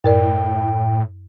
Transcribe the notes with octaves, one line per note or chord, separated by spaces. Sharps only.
F#2 A2 A#4 D5 G5